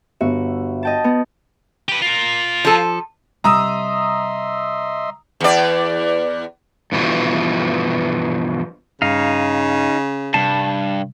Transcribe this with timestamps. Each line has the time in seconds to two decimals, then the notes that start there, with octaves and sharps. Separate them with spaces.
0.21 G1 F#4 E5
0.83 D#5 G5 A5
1.04 B3
1.89 G4 B4
2.02 F4 A#4
2.65 F3 A4
3.44 C3 G3 D#5 E5 A#5 C6 D#6 E6
5.40 E2 D5
6.92 G2 B2 E3 F3
9.02 G2 C#3 D#4 F5
10.34 G2 C3 G3 A5